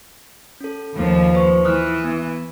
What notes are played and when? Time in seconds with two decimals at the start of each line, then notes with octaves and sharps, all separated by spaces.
0.61 C#4 A4
0.95 D#2 F3
1.33 B4 C5 C#6
1.65 E3 D#6 F6 F#6
2.04 B3